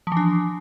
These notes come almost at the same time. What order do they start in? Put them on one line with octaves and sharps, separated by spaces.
F3 E3 D4